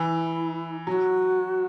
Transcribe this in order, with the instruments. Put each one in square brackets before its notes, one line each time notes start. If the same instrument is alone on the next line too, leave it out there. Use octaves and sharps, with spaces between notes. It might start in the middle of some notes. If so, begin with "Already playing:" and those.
Already playing: [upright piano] E3 [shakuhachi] E4
[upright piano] F#3 [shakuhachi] F#4